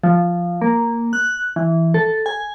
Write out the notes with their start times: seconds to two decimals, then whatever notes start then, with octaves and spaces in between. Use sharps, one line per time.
0.04 F3
0.62 A#3
1.13 F#6
1.56 E3
1.94 A4
2.26 G#5